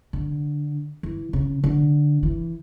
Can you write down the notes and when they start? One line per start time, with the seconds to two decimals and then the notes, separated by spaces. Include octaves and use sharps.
0.13 D3
1.03 E3
1.33 C#3
1.64 D3
2.23 E3